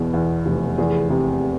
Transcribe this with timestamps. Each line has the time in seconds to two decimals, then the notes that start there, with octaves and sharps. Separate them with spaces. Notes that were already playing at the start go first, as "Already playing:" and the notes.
Already playing: E2 B2
0.13 E2
0.46 F1
0.78 E2 G#4
1.10 C3